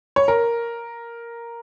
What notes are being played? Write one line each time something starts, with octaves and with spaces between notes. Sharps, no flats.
C#5
A#4